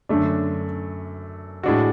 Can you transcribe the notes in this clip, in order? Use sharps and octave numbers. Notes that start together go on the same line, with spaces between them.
F#2 D3 A3 D4
A2 G#3 D4 F#4